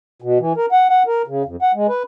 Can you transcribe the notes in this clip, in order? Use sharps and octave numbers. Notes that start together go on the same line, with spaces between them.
B2
E3
A#4
F#5
F#5
A#4
C#3
F2
F#5
G#3
B4